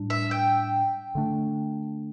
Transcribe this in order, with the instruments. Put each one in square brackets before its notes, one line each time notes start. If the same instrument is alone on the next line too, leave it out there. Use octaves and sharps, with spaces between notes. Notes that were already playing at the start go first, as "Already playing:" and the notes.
Already playing: [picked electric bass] A2 G3 D4
[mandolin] E5
G5
[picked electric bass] D3 A3 D4